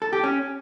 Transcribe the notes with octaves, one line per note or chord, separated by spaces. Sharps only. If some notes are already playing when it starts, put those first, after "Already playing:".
A4
G4
C#4